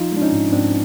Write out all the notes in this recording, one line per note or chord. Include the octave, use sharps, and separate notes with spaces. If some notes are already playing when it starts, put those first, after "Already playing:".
Already playing: F3 D#4 F4
G#3 D4
C#4 D#4
G#2
G#2 C4 D4